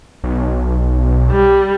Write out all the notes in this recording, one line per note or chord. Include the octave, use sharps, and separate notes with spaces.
B1
G3